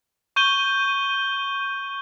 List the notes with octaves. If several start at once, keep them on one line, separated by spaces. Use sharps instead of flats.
C#6 G6 D#7 G7